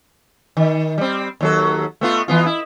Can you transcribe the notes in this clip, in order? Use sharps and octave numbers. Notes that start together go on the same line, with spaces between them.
D#3
G3 C4
D#2 F#3 A4
A3 B3 F4
E3 B3 F4
E4